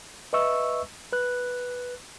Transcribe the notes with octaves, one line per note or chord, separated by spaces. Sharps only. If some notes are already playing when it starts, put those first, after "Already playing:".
B4 D#5 E5 C#6 E6
B4 F#6